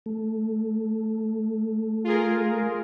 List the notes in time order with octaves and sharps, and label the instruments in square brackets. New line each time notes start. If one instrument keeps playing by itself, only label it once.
[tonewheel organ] A3
[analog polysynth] F4 G#4 A#4